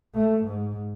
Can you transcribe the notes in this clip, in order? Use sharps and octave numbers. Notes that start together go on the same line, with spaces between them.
A3
G#2